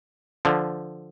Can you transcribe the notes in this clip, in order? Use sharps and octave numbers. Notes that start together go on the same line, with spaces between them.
D3 F3